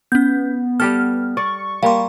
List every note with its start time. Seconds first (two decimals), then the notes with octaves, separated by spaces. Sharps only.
0.12 B3 C#4 G6
0.80 G3 G4 A4 F6
1.37 D5 C#6
1.83 G3 A#3 F5 C6